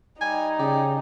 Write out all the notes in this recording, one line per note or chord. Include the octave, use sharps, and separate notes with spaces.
G3 D#4 G#5
C#3 G4 G#4 D5